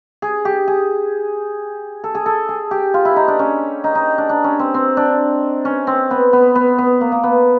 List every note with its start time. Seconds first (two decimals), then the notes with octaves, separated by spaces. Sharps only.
0.22 G#4
0.45 G4
0.68 G#4
2.04 A4
2.15 G#4
2.26 A4
2.49 G#4
2.71 G4
2.94 F4
3.05 E4
3.16 D#4
3.28 D4
3.39 C#4
3.84 D#4
3.95 D#4
4.18 D4
4.29 D4
4.44 C#4
4.59 C4
4.74 C4
4.97 D4
5.65 C#4
5.87 C4
6.11 B3
6.33 B3
6.55 B3
6.78 B3
7.01 A#3
7.12 A#3
7.23 B3